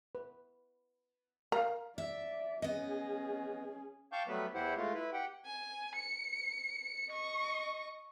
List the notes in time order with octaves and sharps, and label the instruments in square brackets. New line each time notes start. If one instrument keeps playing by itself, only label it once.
[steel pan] B4
[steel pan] A#4 F5 [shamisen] A#5
[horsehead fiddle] D5 [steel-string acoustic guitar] E5
[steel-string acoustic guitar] B3 D#5 [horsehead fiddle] C#4 G#4
[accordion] F5 G5 A5 C#6 D6 G6
F#3 G3 A3 B3 B4
E2 E3 E4 G4 C5 F#5
G#3 A3 F4
E4 B4
G4 F#5 G5
[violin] G#5
C#7
D#5 C#6